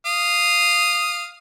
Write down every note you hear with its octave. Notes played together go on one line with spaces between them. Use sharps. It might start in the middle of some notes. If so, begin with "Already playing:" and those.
F5 D#6